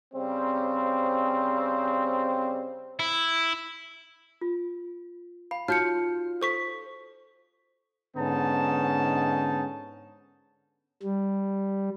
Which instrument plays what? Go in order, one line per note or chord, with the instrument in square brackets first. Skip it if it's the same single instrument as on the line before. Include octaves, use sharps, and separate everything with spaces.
[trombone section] C#3 G3 C4
[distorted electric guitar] E4
[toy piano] F4
[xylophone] F5 [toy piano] B5
[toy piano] D#4 F#4 C#5 [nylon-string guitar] F4 [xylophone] F6 G6 C#7
[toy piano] A4 [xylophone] C5 C#6 B6
[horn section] G#2 D3 B3 C#4 D#4 A5
[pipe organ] G3